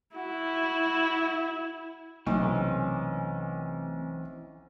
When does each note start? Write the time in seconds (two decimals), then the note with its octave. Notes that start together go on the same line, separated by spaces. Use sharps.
0.16 E4 F#4
2.27 B1 C3 E3 A3 C4 C#4